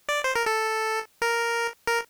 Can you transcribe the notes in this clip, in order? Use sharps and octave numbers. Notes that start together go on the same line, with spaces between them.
D5
C5
A#4
A4
A#4
A#4